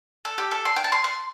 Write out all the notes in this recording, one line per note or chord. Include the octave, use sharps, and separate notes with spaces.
A4
G4
A4
C6
G5
A5
C6
C6